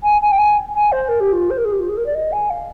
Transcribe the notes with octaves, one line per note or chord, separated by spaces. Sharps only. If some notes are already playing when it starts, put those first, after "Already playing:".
G#5
G#5
G5
G#5
G#5
C5
A#4
G4
F4
C5
A#4
G#4
G4
F4
G#4
A#4
D5
D#5
G#5
F5